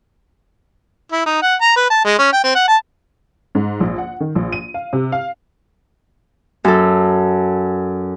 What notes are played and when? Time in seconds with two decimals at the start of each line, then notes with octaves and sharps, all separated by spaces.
1.12 E4
1.26 D#4
1.42 F#5
1.61 A#5
1.76 B4
1.90 A5
2.05 G#3
2.19 C#4
2.33 G5
2.44 C4
2.55 F#5
2.68 A5
3.55 G#2
3.80 A#1
3.98 F#5
4.20 D#3
4.35 A#1
4.52 D#7
4.74 F5
4.93 C3
5.12 F5
6.65 F#2 A4